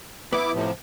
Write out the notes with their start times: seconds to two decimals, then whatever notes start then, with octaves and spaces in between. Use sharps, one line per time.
0.33 B3 E4 D6
0.54 A2 C3 F3